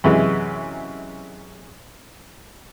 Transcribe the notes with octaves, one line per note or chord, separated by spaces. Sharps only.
F#2 C3 E3 G#3